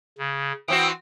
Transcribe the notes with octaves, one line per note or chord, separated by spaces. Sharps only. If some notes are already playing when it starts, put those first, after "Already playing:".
C#3
E3 C4 F#4 G5 D#6